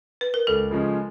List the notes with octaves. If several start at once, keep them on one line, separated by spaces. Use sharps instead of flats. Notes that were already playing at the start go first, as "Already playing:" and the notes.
B4
A#4
C#2 A4
C#3 F3 G#3 C#4